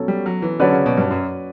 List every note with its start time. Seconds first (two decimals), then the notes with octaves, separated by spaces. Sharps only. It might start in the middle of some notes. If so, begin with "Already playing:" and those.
Already playing: B2 F#3 C#4 A4
0.08 G3
0.26 F#3
0.42 E3
0.60 D3 F#3 C#4 F#4 B4 D5
0.73 C#3
0.86 B2
0.98 G2
1.10 F#2